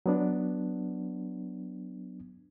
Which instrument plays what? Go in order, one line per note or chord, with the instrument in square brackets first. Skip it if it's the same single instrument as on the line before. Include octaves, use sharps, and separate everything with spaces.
[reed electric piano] F#3 B3 D4